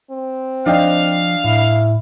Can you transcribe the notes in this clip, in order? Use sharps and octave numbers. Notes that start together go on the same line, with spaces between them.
C4
F3 D4 D#5 F5 G5
A2 E4